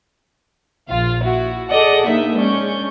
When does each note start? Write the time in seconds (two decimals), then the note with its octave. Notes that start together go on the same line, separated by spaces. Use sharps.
0.90 A#1 F4 F5
1.22 E4 F#4
1.69 G#4 A4 D5 D#5 F#5 A5
2.07 A#1 A#3 D#4 E5
2.38 G#3 C#4 D4 C#6 G6